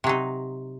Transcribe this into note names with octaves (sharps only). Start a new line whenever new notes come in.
C3 F#3 D#4